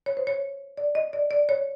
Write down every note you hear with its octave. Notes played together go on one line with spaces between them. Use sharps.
C#5
C5
C#5
D5
D#5
D5
D5
C#5